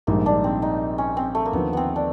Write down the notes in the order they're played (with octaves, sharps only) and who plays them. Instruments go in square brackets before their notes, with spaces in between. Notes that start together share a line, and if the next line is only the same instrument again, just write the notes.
[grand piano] A#1 G#2 D#3 G3 [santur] A#3
[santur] D4
C4
D#4
C#4
C4
A3
A#3
[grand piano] D#2 D3 F3 [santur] B3
[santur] B3 C4
D4